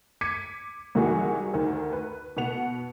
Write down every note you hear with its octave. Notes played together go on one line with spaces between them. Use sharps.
D6 G#6 B6 C#7 D#7
C2 D#3 E3 F#4 G#4 G#5
D2 D#3
B4
B2 B3 F#5 F7